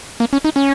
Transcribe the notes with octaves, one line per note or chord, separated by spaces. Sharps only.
A#3
C#4
D#4
C#4